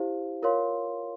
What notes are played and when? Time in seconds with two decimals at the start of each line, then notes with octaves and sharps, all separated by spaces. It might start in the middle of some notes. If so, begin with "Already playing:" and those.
Already playing: E4 G4 C5 F5
0.42 F4 A#4 C#5 F5 C6